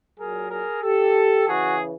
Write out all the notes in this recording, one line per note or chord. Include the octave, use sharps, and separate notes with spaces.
A#2 F#3 G#4 A#4
G#4 A#4
G4 A4
C#3 E3 F#4 G#4